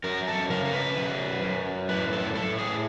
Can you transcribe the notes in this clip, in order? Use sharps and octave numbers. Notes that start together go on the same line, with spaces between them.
F#2 A#4
A4
C#3 A#4
A#4
B4
F#2
F#2
A2 B4
A4
A2 A4
G#4